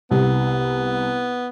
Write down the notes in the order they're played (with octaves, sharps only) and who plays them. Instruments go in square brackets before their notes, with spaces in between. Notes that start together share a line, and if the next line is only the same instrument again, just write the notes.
[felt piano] C2 [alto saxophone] B3